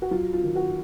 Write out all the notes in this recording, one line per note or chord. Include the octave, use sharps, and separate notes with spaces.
F#4
F#3 F4
F4
D#3
F#4